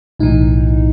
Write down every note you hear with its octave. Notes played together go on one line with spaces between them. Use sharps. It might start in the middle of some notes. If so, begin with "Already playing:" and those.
B1 A2 E3 D#4